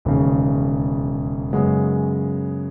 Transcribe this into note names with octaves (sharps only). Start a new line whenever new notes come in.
E1 D#2 C#3
F#2 C#3 G#3 B3